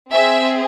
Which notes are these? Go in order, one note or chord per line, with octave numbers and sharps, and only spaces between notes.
C4 G#4 E5